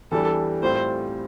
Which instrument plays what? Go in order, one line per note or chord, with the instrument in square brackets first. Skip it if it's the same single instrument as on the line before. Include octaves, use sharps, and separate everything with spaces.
[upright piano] E2 E3 G3 D4 [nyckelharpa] A4
[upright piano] A2 G3 C4 F4 [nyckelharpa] C5